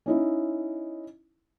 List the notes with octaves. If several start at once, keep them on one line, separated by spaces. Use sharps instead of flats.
C#4 D#4 E4